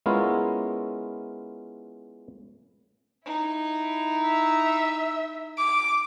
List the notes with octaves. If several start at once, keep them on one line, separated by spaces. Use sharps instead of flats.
G#3 B3 C#4 E4 F4 A#4
D#4 E4
E5
D6